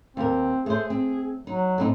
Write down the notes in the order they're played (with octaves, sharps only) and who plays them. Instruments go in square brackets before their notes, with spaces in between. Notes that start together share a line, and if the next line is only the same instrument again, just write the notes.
[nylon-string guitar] D#2 A#4 [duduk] C4
[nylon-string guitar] A3 C5 [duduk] G#4
[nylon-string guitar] C4
[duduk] F#3 [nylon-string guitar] D#4
[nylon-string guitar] A2 C4 D#4